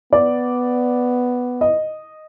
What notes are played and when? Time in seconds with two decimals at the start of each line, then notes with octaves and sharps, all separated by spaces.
0.13 B3 D5
1.61 D#5